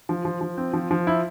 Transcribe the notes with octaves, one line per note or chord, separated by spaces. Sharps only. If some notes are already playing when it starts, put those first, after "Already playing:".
F3
F3
F3
C4
F3
F3
E4